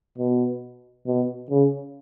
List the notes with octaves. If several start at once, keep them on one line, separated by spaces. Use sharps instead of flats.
B2
B2
C#3